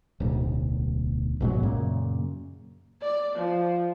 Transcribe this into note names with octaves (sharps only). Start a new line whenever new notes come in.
D1 B1
A#1 G#2 B2 F#3
F#2 A#2 C#3
D5
F3